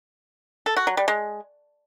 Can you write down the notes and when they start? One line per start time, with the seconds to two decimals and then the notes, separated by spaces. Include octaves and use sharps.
0.66 A4
0.77 F#4
0.87 F#3
0.97 G3
1.08 G#3